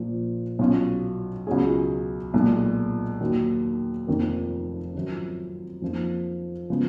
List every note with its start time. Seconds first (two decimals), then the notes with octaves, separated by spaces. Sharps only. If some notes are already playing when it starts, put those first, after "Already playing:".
Already playing: A#1 A#2 F3
0.59 B1 B2 F#3 C#4 F4
1.47 C#2 B2 F#3 C#4 G#4
2.34 B1 A#2 G#3
3.21 D#2 D#3 F#3
4.07 F1 F2 D#3 A#3
4.95 G#1 F#2 F3
5.82 F2 F3 A#3 D#4
6.70 C#3 F3 G#3 B3